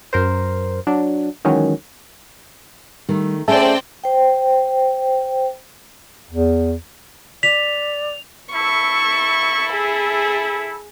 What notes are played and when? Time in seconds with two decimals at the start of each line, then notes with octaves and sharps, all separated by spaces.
0.13 F#2 A#4 C5
0.87 F#3 D4
1.45 D#3 E3 F#3 G#3 C#4
3.09 D#3 G3 A3
3.48 A3 C4 C#4 G#4 D5 E5 G5 A5
4.04 C5 G5
6.30 E2
7.43 D5 B6 F7
8.53 E4 A4 C#6
9.74 G#4